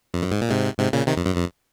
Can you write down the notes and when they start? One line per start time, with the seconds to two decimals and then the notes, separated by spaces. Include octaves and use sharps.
0.14 F2
0.22 F#2
0.31 G#2
0.41 A#2
0.50 G#2 C3
0.78 G#2 C3
0.93 A#2 C#3
1.07 C3 D#3
1.17 F2
1.26 F#2
1.35 F2